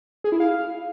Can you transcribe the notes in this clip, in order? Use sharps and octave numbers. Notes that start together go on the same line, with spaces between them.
G#4
E4
F5